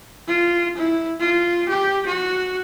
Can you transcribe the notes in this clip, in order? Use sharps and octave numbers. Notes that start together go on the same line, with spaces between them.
F4
E4
F4
G4
F#4